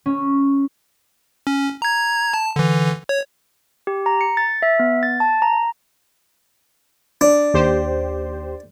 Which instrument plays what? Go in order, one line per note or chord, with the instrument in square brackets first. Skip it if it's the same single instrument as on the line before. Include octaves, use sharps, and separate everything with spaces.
[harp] C#4
[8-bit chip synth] C#4
A#5 G#6
A5
D3 E3
C#5
[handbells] G4
A#5
C#7
A6
E5
B3
A6
A5
A#5
[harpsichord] D4
[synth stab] D#2 G4 C5